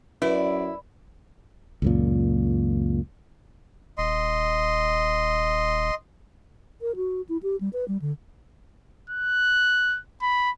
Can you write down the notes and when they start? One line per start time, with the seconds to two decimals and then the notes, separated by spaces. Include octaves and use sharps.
0.22 F#2 E4 B4 D5
1.82 C#2 F#2 A#2
3.98 D#1 D#5 C6
6.81 A#4
6.96 F#4
7.29 E4
7.43 G4
7.60 G3
7.73 B4
7.88 G3
8.01 D3
9.10 F#6
10.22 B5